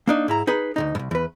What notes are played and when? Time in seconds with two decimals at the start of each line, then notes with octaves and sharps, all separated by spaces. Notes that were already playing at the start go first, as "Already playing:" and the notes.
0.08 A#3 D4 D#4
0.28 G#2 E4 A#5
0.47 D#4 G#4 B4
0.76 D2 G#2 D#4
0.95 C2 G2
1.11 E2 B4